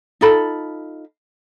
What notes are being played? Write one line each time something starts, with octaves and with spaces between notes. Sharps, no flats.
D#4 F4 A4 B5